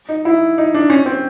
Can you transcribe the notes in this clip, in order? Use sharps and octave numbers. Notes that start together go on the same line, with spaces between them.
D#4
E4
D#4
D4
C#4
C4